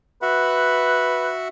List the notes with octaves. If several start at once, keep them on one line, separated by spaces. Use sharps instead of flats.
F#4 B4 E5 F#5